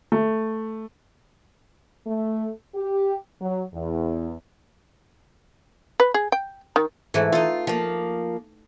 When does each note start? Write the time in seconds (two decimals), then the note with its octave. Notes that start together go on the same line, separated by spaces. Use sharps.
0.12 A3
2.07 A3
2.75 G4
3.41 F#3
3.74 E2
6.00 B4
6.14 G#4
6.32 G5
6.76 D#3
7.14 G#2 E3 A3
7.32 D#4 F4 A4
7.67 F3 A#3